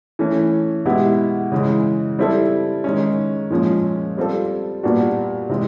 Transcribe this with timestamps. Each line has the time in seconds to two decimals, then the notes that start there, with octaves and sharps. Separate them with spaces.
0.19 E3 A3 C#4
0.85 B2 G#3 B3 E4 G4
1.52 C#3 E3 G#3
2.19 G3 C4 E4 A4
2.84 D#3 G#3 C#4
3.50 A#2 F3 G#3 C#4
4.17 G3 C4 F4 A4
4.83 A#2 G3 B3 D4 F#4
5.50 C3 E3 G#3